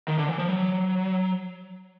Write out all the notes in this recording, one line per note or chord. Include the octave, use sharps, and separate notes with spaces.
D#3
D3
E3
F3
F#3